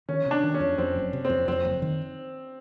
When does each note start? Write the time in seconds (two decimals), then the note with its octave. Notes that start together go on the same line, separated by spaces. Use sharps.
0.09 D#3 C#4
0.26 C3
0.31 D4
0.43 D#3
0.54 C#4
0.60 F2
0.78 F2 C4
0.96 F#1
1.13 C3
1.25 C4
1.30 F2
1.48 F2 C4
1.65 F#1
1.82 D#3